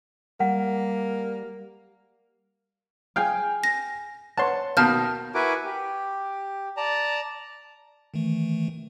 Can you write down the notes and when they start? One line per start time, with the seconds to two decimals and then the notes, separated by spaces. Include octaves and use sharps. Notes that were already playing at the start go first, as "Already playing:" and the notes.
0.40 G3 A#3 F#5
3.16 G#4 F5 G5 G#5
3.64 A#6
4.37 B4 C#5 F#5 A5 C6
4.77 B2 D#3 A#3 F5 A5 F6 G6
5.35 E4 F#4 A#4 B4 G#5 D6
5.65 G4
6.77 D5 A5 A#5
8.14 D#3 E3 A3